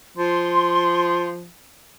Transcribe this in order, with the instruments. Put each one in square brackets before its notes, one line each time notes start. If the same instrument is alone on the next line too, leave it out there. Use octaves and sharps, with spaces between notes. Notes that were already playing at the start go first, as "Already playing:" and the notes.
[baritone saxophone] F3 [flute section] C6